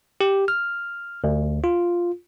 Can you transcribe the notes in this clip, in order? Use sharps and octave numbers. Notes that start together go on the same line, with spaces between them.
G4
F6
D2
F4